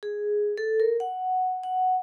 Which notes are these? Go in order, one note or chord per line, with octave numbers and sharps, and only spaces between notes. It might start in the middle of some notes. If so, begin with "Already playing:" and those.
G#4
A4
A#4
F#5
F#5